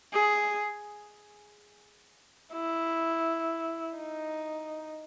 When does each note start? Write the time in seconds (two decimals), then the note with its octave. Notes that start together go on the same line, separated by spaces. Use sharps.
0.13 G#4
2.53 E4
3.97 D#4